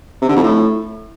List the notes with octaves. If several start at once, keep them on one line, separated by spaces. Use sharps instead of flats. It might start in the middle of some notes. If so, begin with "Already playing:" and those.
C3
D3
F2
A2